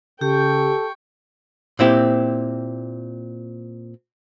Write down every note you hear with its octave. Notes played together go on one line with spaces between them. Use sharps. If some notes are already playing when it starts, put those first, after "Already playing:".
C#3 G4 A4 G5 C#6
A#2 C4 E4 G4